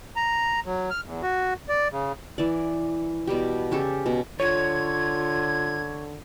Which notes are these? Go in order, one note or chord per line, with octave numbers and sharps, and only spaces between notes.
A#5
F#3
F6
E2
F#4
D5
C#3
E3 D5
B2 G3 G4
C#3 C#4 G4 A4
B2
D3 F4 C#5 G#6